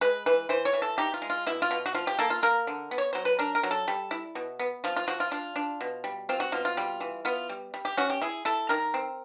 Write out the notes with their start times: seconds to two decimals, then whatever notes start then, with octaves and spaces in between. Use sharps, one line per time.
0.01 G#3 B4
0.26 E3 B4
0.49 E3 C5
0.65 C#5
0.73 E3
0.82 A4
0.98 D#4 G4
1.14 F4
1.22 G#3
1.30 F4
1.46 B2 E4
1.62 F4
1.71 B2
1.86 F#4
1.95 F3 F4
2.07 G4
2.19 A#3 A4
2.30 F4
2.43 A#3 A#4
2.67 D3
2.91 B3
2.98 C#5
3.13 F#3 C5
3.25 B4
3.39 D4 A#4
3.55 A#4
3.63 F#3
3.71 A4
3.88 G3
4.11 E4
4.35 B2
4.59 B3
4.84 F3 F4
4.97 F4
5.08 F3 F#4
5.20 F4
5.31 D4 F4
5.56 D4
5.81 B2
6.04 G3
6.29 C4 F4
6.40 F#4
6.52 B2 F4
6.65 F4
6.77 G3
7.00 E3
7.25 B3 F4
7.49 G3
7.74 G3
7.85 G4
7.97 C#4 F#4
8.10 G4
8.22 E4 G#4
8.45 E4 A4
8.69 D#3 A#4
8.94 C4